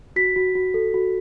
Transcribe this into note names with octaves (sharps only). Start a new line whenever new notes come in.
F#4 B6
F#4
F#4
A4
F#4